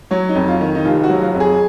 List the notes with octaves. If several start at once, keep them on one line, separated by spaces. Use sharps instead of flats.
F#3 C#5
D#4
F2
F4
D#3
D#4
F1 F4
F#4
F#3
F4
F2
G#4